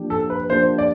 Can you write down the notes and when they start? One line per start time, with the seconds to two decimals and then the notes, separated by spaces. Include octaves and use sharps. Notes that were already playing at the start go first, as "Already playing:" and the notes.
Already playing: F3 A#3 D4 G4
0.10 A4
0.30 B4
0.49 F3 A#3 D4 G4 C5
0.78 D5